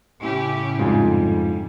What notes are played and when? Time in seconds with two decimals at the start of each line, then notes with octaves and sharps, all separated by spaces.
0.19 A2 C#3 C#4 E4 G4
0.79 F2 G#2 G3 F4 G#5